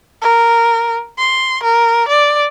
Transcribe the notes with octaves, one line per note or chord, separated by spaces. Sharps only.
A#4
C6
A#4
D5